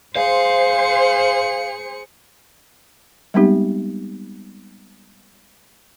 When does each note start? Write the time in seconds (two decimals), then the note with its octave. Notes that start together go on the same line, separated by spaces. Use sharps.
0.16 G#4 C5 F5 C#7
3.34 G3 G#3 B3 C4 D#4 G4